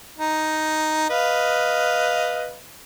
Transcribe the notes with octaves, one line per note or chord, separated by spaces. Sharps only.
D#4
B4 D#5 F5